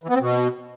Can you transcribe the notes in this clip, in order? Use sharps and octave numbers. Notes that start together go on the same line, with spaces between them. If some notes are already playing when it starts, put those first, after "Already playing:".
E3
B3
C4
B2